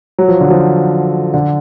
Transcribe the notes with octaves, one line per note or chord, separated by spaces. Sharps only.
F#3
F3
D3
F3
D3